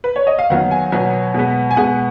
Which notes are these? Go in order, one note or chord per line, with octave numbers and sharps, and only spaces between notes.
B4
C#5
D#5
F5
D#3 F#3 B3 F#5
G#5
B2 F#3 B3
B2 G#3 B3
G#5
B2 G#3 B3 F#5